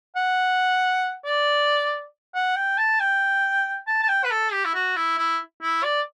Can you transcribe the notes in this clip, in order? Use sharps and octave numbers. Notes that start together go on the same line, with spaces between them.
F#5
D5
F#5
G5
A5
G5
A5
A5
G5
B4
A4
G4
E4
F#4
E4
E4
E4
D5